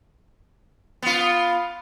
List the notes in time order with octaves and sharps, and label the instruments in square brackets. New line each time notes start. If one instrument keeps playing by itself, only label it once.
[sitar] B3 F4